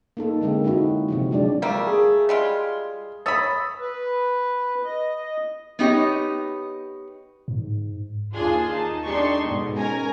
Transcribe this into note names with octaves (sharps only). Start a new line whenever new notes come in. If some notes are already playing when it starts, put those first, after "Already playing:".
A#3 D#4 A4
D3 G#3 A#3 C4
C4 D#4 E4 F#4
C3 F3 C4
F#3 G#3 D4 D5
G3 A3 A#3
G#4
G3 G#3 F4
C#5 B5 D#6 E6 A6
B4
D#5
B3 D#4 G4 C#5 D#5
G#2
D#2 D4 F4 G#4 G#5 C6
D#4 A5
D4 D#4 G4 A4 C6 C#6
G#2 B2
C#4 A#4 G#5 A#5